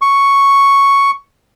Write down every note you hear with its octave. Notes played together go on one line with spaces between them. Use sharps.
C#6